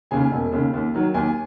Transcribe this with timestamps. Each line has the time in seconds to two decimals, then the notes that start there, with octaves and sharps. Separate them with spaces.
0.11 D#2 C#3 G#5
0.32 E1
0.52 D#2 C#3
0.74 D#2
0.94 D#3 F#3
1.14 D#2 G#5